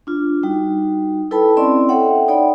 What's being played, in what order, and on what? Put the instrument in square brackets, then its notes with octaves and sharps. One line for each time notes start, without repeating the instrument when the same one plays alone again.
[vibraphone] D4 F4
G3 D#4 F#4
E4 A4 B4 G5 A5 B5
C4 C#4 E4 D5 D#5 C6
A4 C#5 E5 F#5 G5
D#4 C#5 D5 F#5 G5 B5